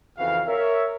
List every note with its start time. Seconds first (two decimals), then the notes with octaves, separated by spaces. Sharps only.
0.17 F2 C#3 E3 F#4 F5
0.48 A#4 C#5 E5